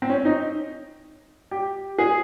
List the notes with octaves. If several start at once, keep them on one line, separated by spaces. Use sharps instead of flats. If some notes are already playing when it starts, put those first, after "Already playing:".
C4
C#4
D#4
G4
G#4